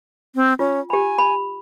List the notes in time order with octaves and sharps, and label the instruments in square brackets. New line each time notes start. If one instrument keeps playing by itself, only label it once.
[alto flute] C4
[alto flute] C#4 [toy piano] F4
[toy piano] G4 B5 [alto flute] G#5
[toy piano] B5